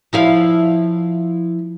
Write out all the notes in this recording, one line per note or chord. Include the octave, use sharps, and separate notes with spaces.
F3 E4 F5